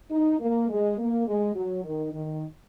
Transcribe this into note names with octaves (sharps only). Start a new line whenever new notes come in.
D#4
A#3
G#3
A#3
G#3
F#3
D#3
D#3